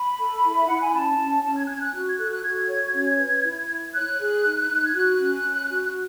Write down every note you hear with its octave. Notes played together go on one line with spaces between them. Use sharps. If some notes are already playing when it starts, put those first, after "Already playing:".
Already playing: B5
A4
E4
E5
E4 F#5
G#5
C#4 A5
C#4
C#4 A5
G#6
F#6
C#4 G#6
F#6
F#4 F#6
G#6
A4 F#6
F#6
F#4 G#6
C#5
C#4
B4
E4
E4
C#5 F#6
G#4
D#4
D#4
G#6
F#4 F#6
C#4
C#4
F#4